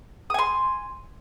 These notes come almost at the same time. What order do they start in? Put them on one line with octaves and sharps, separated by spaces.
D#6 G#5 C6